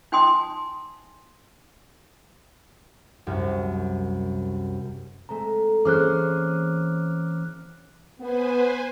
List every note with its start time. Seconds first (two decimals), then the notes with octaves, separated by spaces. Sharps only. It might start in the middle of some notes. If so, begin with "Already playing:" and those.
0.12 D#4 G5 G#5 C6 D#6
3.27 C2 F#2
5.29 G#3 A3 C4 A#5
5.85 E3 A#3 C#4 G#4 C5 D6 F6 F#6
8.20 B3 B4 C5 G#5